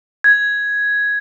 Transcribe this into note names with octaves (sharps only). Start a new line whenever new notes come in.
G#6